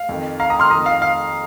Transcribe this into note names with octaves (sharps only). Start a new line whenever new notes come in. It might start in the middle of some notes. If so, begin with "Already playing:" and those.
Already playing: F5
F2 D#3
F5 A#5
A#5 D#6
C6 F6
F2 D#3 A#5 D#6
F5
F5